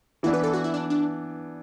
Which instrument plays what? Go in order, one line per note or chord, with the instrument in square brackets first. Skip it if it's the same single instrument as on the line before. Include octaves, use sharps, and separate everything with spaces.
[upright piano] E3 B3 D4 [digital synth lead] E4
[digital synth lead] B4
A4
F#4
E4
D4
D4